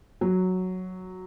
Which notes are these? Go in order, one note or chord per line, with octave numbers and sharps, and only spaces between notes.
F#3